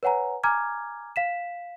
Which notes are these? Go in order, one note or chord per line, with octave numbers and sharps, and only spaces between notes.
B4 C#5 F#5 G#5 A#5
G#5 A#5 D6 F6 G#6
F5 B6 E7